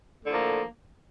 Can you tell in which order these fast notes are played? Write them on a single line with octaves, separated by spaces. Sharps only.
A2 D3 F3 A#3